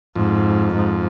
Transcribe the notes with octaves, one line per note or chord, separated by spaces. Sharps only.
F2 G#2
G#2